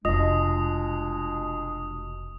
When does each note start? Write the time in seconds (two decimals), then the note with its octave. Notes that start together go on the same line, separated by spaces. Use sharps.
0.05 F1 B2 G#3 D4 F4 D#5 D#6 A#6